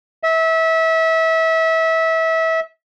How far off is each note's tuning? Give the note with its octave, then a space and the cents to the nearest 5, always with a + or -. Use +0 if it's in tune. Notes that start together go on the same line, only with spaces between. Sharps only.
E5 -25